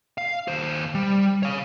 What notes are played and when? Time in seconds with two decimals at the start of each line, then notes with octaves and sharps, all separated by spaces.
0.18 F5
0.48 D#2 C5
0.95 G3
1.43 C#5 F5